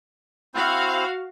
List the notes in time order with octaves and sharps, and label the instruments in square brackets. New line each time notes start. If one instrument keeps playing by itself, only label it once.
[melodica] C4 E4 C5 [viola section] F#4 F5